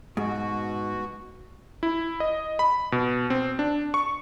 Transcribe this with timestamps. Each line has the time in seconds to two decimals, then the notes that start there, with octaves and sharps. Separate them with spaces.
0.17 G#2 B2 F#4
1.83 E4
2.20 D#5
2.59 B5
2.92 B2
3.30 C4
3.59 D4
3.94 C#6